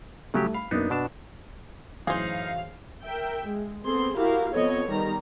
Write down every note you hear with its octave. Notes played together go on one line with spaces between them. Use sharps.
C#3 F#3 G3 A3 G4
F5 B5
F#2 A#3 B3 D4 D#4
B2 B3 D4 A5
F#2 A2 E3 D#4 G#4 C5 F5
A#4 E5 G5
G#3
B3 C4 G#4 A4 C6
E4 F#4 G4 A#4 F5
F3 B3 C4 A4 C#5 D#5
D#3 G3 B3 A#5